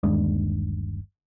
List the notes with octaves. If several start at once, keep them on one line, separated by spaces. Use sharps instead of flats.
G1 D#2 G#3 D4